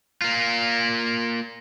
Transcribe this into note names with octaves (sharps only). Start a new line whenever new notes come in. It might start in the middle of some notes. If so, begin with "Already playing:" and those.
A#3 F4